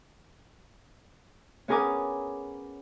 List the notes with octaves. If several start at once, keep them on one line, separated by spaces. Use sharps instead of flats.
B3 C#4 G#4 A#4 G#5 D6